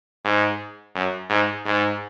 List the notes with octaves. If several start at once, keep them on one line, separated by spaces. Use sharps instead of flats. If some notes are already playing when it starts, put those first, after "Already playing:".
G#2
F#2
G#2
G#2